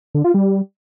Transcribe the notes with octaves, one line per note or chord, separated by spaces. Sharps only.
D3
F4
G3